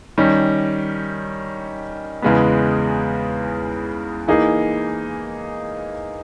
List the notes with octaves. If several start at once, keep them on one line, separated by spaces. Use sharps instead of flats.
D#3 G3 C#4
E2 C#3 G#3 B3
E3 A#3 D#4 G#4